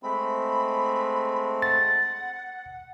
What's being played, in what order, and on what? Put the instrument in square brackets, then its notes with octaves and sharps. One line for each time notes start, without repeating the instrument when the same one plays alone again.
[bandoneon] G#3 A3 C4 [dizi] B5
[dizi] F#5 [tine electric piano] A6